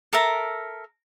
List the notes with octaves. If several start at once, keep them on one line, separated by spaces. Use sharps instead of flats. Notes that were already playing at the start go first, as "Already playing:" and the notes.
A4 A#4 E5 A#5